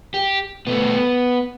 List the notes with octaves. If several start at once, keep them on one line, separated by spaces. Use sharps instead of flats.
G4
B2 A3 B3